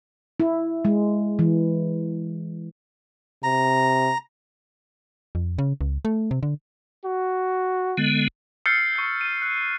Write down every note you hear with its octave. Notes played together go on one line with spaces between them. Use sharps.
E4
G#3
E3
C3 A#5
F2
C#3
C#2
A3
C3
D3
F#4
D3 G#3 B3
E6 F6 G6 A6 C7 C#7
C#7
C#6 G6
D#7
F#6